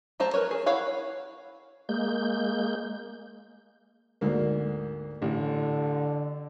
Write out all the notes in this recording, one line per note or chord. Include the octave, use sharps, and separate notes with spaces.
F#3 A3 C5 A5 A#5
A#4 B4 C#5
G#4
E4 C#5 F5 F#5
G#3 A#3 G6
D2 G#2 A#3
A1 D3